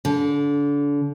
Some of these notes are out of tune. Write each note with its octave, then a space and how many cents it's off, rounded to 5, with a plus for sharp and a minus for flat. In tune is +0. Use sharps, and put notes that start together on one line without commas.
D3 -30